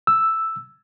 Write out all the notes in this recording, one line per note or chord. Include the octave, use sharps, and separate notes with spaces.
E6